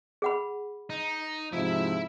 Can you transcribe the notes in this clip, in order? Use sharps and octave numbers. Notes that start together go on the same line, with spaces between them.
G#4 F#5 B5
D#4
G#2 C3 F3 E4 E5